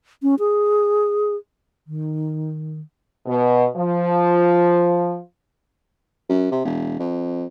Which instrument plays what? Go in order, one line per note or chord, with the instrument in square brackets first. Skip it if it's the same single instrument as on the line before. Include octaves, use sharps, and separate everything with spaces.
[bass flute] C#4
G#4
D#3
[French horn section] B2
F3
[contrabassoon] F#2
C3
E1
F2